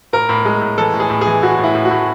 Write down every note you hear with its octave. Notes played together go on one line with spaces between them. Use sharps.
A2 A#4
A2
G#3
A2
E3 A4
A2
G#4
A2
E3 G#4
A2 F#4
A2
E4
A2
F#4
A2